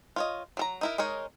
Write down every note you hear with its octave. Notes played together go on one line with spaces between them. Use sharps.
F4 C#5 D#5
F#3 A4 A#5
D#4 E4 A#4
G#3 D#4 A#4 C#5